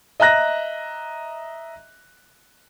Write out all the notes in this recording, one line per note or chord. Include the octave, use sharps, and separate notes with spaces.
D#5 E5 A#5 F#6 A#6